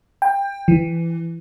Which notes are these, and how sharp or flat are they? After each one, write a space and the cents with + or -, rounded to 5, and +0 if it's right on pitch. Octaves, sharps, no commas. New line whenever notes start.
G5 +25
E3 +20